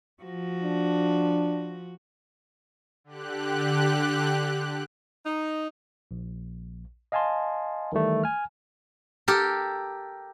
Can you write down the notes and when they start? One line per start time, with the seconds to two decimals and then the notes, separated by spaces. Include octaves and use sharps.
0.23 F3 F#4
0.63 D4
3.04 D3 G4 F#6
5.26 D#4
6.11 A#1
7.12 D#5 F5 G#5 A5 C6
7.92 D#3 E3 G3 A3
8.24 G#5 F6
9.28 G4 A4 A#4